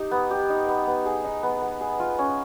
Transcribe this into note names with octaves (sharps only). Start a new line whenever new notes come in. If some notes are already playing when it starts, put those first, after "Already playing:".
Already playing: D#4 G4
B3
G4
D#4
B3
B3
G#4
D#4
B3
B3
G#4
F4
C#4